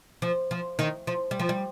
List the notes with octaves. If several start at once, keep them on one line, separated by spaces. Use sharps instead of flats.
F3
F3
D#3
F3
G3
F3
G3